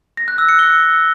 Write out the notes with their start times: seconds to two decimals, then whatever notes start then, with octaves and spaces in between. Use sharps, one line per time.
0.17 A#6
0.28 F#6
0.38 E6
0.49 C#7
0.59 G7